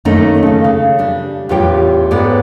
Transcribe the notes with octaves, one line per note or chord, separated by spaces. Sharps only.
F#2 D#3 A3 A#3 C#4 D#4
C#3 C#4
C#3
G3 D4
E2 A2 F4 G4 C#5 G5
G#2 B3 A4 C#5 D5